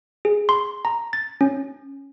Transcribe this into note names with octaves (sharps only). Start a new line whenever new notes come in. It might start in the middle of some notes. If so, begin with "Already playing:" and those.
G#4
C6
A#5
A6
C#4